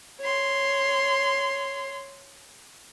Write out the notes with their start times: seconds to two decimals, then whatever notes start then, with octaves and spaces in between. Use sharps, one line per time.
0.21 C#5 C6